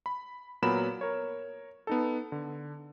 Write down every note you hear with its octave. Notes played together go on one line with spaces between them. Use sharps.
B5
A#2 F#3 B3 A#4 B5 E7
A#4 C#5
B3 D#4 A4
D3